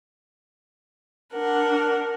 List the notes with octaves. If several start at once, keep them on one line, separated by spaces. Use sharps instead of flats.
D4 A#4 F#5